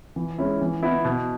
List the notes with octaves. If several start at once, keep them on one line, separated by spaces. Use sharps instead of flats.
E3
G#3 C#4 E4
E3
B3 E4
B2